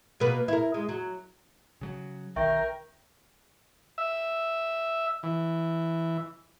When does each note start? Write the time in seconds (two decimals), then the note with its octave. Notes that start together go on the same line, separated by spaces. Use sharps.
0.20 B2 A#3 B4
0.48 E4 A#4
0.74 G#3
0.89 F#3
1.81 C#3 F#3
2.36 B1 D#3 A#4 E5 G5 C#6
3.98 E5
5.23 E3